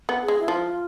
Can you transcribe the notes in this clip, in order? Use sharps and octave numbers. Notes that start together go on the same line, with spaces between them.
B3
G#4
G#3
E4
F3 F4